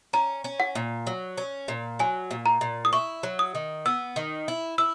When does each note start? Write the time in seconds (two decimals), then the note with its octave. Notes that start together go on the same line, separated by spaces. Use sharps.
0.13 C#4 A#5
0.44 C#4
0.60 F#5
0.75 A#2
1.07 F#3
1.37 C#4
1.68 A#2
1.99 F#3 G#5
2.31 A#2
2.46 A#5
2.61 A#2
2.85 D#6
2.93 E4 C#6
3.23 F#3
3.39 D#6
3.55 D#3
3.86 B3 E6
4.16 D#3
4.48 E4
4.78 E4 E6